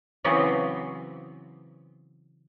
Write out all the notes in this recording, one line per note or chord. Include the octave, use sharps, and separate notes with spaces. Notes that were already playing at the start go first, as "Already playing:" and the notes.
C#3 E3 F#3 B3 C4